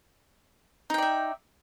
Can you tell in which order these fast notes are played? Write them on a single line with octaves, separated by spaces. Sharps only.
D#4 G5 D5 E5